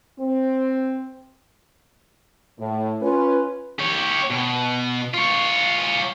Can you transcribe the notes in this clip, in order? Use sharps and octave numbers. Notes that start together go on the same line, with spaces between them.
C4
A2
C#4 F4 B4
G4 C#5
B2
F4 C#5